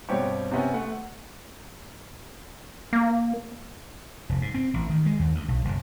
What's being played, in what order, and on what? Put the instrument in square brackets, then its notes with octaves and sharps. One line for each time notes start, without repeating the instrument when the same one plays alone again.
[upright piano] G2 B2 C4 G4 C#5
C3 B3 C#4
A3 F#5
[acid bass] A#3
[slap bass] F1
G#2
C4
A1
D#3
G#3
D#2
D2
B1
F#1